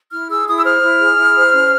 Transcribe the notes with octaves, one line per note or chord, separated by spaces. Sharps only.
E4 F6
G#4 E6
E4 D#6
E6
C5 F6
E4
G#4
E4
C5
C#4